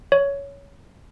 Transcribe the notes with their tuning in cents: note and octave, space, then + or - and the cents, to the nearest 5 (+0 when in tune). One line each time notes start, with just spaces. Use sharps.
C#5 +15